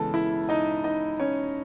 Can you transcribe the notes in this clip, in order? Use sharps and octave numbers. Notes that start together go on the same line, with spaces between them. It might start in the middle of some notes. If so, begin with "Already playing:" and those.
Already playing: C#3 E3 G#3 B3 A4 A5
E4 E5
D#4 D#5
D#4 D#5
C#4 C#5